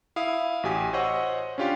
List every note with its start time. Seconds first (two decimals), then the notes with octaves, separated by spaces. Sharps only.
0.16 E4 F5 D#6
0.63 A1 F#4 G4 G#5 D#6
0.93 C5 C#5 D#5 F#5 C#6 E6
1.58 C#4 D4 F4 G4 F5 C6